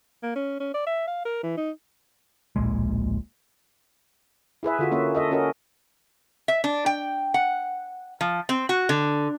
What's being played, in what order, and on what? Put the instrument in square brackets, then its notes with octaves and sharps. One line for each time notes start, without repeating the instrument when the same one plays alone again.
[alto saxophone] A#3
C#4
C#4
D5
E5
F5
A#4
E3
D#4
[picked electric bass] D1 A#1 A#2 G#3
[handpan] E4 G#4 B4 E5
D3 F4 F#4
A#3 C#4 E5
A4 D#5 E5
C#4 F#4 A#4 D#5
[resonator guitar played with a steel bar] E5
D4
G5
F#5
F3
C4
F#4
D3